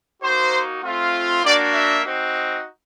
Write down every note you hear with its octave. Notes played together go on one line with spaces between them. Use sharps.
A#3 D#4 F#4 C5
A3 C4 F4
A#3 D4 F#4 D5
E5
C4 D#4 F#4